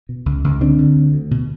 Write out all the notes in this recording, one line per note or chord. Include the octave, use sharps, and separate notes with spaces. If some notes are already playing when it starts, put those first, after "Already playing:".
B2
C#2
C#2
D3 C4 D4
D3
D2
D2
B2